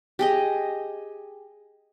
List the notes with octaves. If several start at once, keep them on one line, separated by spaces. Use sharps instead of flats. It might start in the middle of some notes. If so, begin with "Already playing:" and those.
G4 G#4 D#5